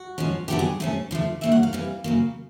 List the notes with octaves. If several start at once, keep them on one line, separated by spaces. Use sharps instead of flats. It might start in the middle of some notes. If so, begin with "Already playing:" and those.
Already playing: F#4
F3 G#3 C#4
D3 F#3 B3 D4 G4
G#4
C3 F3 A3 C#4
D3 F3 A3
E3 G3 A#3 C#4 E5
F#5
F5
C3 E3 G3
C#3 F#3 A#3